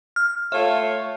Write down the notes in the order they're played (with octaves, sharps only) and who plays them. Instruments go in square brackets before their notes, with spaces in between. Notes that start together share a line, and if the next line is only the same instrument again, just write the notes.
[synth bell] F6
[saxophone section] A3 F4 C#5 [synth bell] E5